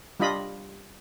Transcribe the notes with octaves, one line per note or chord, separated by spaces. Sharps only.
G3 D4 F4 D#5 B5